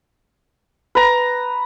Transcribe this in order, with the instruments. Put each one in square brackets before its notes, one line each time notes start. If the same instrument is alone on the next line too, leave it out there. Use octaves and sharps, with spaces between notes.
[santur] B4 A#5